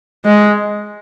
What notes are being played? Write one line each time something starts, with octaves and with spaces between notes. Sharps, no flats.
G#3